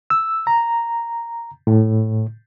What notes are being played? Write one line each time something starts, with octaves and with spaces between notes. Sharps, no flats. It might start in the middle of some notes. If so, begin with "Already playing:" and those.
E6
A#5
A2